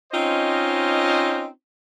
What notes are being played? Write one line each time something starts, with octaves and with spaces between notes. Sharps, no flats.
C4 C#4 D#4 F4 C5 D#5